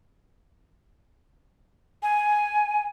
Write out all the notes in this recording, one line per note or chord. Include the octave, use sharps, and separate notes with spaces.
G#5